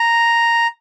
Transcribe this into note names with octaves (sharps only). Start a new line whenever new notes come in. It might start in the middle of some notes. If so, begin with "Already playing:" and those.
Already playing: A#5